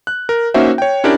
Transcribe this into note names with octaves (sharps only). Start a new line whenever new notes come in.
F#6
A#4
A#3 C#4 D#4 F#4 C5 E5
C#5 G5
C#4 D4 E4 G4 A#4 D5